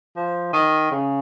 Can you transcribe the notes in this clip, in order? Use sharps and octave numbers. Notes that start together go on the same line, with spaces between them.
F3
D#3
C#3